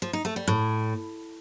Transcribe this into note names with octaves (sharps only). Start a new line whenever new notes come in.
F3
D#4
A3
G3
A2